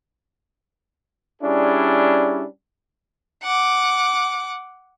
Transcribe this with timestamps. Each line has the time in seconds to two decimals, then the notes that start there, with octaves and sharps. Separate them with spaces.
1.42 G3 C#4 D4 E4 G#4
3.43 F#5 D6